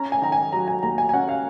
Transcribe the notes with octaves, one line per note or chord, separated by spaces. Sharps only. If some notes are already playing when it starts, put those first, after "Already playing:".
Already playing: C#4 A#5
G#5
D#3 A#5
G#5
F#3 A#5
G#5
D#2 A#5
G#5
G#5
C#4 F#5
F5